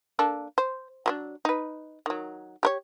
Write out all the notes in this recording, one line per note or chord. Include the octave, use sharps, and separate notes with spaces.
A#3 D4 A4
C5
F#3 B3 D4
D#4 B4
D#3 F#3
G4 A#4 C#5